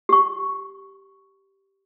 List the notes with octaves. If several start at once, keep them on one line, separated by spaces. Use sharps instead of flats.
G4 C#6